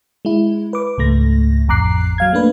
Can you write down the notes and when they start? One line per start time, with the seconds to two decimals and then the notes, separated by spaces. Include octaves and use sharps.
0.25 G#3 E4
0.73 B4 D6
0.98 C#2 G#2 A3 A#6
1.68 A1 F2 A#5 D6 F#6 C7
2.18 F#3 F5 G#6
2.33 A3 A#3 D4 B4